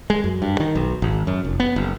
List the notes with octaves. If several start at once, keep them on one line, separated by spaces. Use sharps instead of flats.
G#3
F#2
G2
D#3
B1
G#1
F#2
F1
B3
F#1